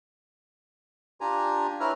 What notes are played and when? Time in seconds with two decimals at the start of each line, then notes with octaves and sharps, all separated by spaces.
1.21 D4 F4 G4 G#5 A#5
1.80 E4 B4 C#5 E5 A#5 F6